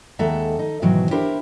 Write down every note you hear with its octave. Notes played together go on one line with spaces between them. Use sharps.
D#2 G#3 A4 E5 F#5 A#5
D#4
G#2 B2 D#3 E3 F#3
D4 E4 G4 A#4 C5